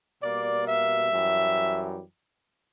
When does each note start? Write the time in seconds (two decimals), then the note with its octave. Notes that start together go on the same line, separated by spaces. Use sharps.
0.23 B2 G3 A#3 D5
0.68 E5
1.13 F#2 E3 G3